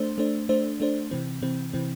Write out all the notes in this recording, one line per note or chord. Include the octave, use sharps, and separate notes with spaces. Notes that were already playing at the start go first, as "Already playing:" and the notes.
Already playing: A3 D4 C5
A3 D4 C5
A3 D4 C5
A3 D4 C5
C3 E3 C4
C3 E3 C4
C3 E3 C4